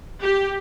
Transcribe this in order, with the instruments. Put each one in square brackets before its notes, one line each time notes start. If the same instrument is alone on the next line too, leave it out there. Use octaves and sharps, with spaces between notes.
[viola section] G4